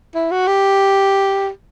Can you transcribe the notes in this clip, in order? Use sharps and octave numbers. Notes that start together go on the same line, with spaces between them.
E4
F#4
G4